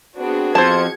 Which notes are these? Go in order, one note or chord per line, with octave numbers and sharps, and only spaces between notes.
B3 C4 D4 F#4 G#4
F2 F3 C5 A5 G#6 C#7